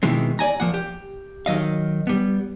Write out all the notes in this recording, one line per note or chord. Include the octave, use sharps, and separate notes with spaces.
B2 D#3 E3 G#3 C4
D5 D#5 G#5 A#5
F3 A#3 F#5
G4
D#3 F#3 D#5 F5
G3 B3